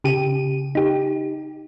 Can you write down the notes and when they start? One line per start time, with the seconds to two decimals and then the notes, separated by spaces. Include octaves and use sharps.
0.04 C#3 G4 D#7
0.75 D#4 G4